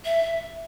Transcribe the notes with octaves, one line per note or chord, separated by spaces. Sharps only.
E5